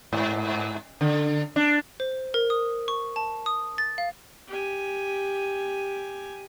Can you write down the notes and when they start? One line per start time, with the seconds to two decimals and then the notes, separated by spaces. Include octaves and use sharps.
0.13 G#2
1.01 D3
1.56 D4
2.00 C5
2.34 A#4
2.50 D#6
2.88 C#6
3.16 A5
3.46 D#6
3.78 A6
3.98 F5
4.48 G4 G#5